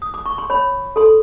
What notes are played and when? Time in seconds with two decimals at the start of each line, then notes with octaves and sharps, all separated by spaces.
0.02 D#6
0.14 D6
0.26 C#6
0.38 C6
0.50 C#5 B5
0.96 A4 C6